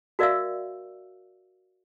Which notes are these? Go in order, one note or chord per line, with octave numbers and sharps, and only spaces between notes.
F#4 A#4 D5 E5 F5 E6